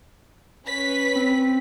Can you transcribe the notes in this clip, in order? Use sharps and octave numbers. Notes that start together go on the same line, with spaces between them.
C#4 B4 B6
C4